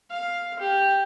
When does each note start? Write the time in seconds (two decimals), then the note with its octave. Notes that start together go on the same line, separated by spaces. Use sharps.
0.10 F5
0.59 G4